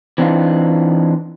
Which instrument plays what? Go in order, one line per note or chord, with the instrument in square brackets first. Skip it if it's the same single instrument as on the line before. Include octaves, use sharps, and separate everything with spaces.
[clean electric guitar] E3 C4 D4 D#4 F4